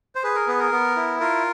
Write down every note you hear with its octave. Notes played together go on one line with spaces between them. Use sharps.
C5
G#4 B4
A#4
B3 B4
A#4
B3
E4
F4 A#4